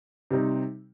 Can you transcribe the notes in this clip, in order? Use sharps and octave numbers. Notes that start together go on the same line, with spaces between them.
C3 G3 C4 D#4